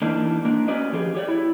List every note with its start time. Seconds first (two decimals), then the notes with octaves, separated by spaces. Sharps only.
0.02 E3 A#3 D4 D#4
0.45 A#3 D4
0.68 C#4 F#4 B4 D5 D#5
0.93 F3 G4 G#4
1.15 G4 C#5 D5
1.28 E4